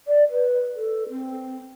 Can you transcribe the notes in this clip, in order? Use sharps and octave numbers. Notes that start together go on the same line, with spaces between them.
D5
B4
A4
C4